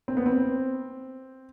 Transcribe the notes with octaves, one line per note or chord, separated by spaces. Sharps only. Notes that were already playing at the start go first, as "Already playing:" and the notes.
C4
B3
C4